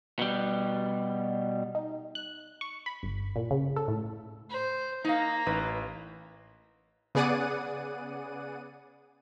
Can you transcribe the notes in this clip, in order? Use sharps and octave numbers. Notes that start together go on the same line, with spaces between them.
B2 G3
D#4
F#6
C#6
B5
G1
A#2
C#3
A4
A2
C5
A#3 D#4 F5
A1 D#4 B4
C#3 B3 G#4 D5 F#5 D#7